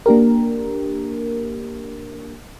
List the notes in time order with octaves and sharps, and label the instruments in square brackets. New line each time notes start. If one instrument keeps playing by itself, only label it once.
[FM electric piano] A#3 D4 G4 A#4